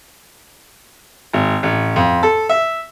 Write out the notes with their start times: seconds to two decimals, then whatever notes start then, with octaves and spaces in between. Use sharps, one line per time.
1.33 G#1
1.63 A1
1.96 F2
2.23 A4
2.49 E5